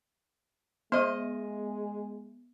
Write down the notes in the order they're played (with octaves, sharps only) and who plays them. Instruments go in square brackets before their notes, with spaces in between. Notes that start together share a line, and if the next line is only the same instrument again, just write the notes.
[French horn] G#3 [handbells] B3 [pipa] C5 D#5